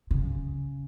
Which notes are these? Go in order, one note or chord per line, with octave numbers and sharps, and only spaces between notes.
C#3